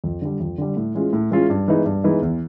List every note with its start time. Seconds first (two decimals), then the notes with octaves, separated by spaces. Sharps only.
0.04 F2
0.22 D3 G3
0.40 F2
0.58 D3 G3
0.77 A2
0.95 E3 G#3 C#4 F4
1.13 A2
1.31 E3 G#3 C#4 F4
1.50 G2
1.68 E3 G#3 B3 D#4
1.86 G2
2.04 E3 G#3 B3 D#4
2.22 E2